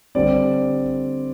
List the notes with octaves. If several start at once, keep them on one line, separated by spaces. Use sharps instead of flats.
D3 G3 C4 D5